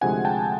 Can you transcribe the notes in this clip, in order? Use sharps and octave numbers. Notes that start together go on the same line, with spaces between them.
D2 C3 F3 G#3 F#5 G#5
G5 A5